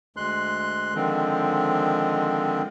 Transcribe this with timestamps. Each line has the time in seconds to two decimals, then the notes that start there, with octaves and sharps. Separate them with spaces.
0.17 D2 G#3 C6 F#6
0.95 D3 D#3 F3 G#3 C4